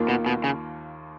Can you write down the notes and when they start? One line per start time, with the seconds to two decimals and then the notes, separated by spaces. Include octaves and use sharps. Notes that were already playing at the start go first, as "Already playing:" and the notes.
Already playing: D#2 D#3 A#3 F4
0.08 B2
0.26 B2
0.44 C#3